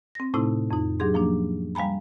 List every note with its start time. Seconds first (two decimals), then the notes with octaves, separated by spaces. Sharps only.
0.15 C4 A#6
0.34 A2 C3 A3 C4 D#4 E4
0.71 F2 D#4
1.00 F#3 D4 G4 G#4 C6
1.14 F3 A#3 C#4 D4
1.75 G3 F5 G#5 A#5 B5